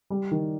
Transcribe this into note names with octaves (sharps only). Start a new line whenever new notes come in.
G3
D#3